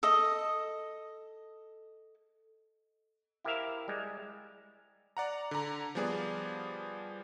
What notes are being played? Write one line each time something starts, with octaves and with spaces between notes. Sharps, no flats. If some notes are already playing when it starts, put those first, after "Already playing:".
A4 D#5
E4 G4 A#4 C5 E5 F5
G3 G#3
D5 F#5 A#5
D3 A#5
F3 G3 B3 G#4 D5